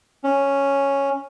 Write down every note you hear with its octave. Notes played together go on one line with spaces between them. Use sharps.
C#4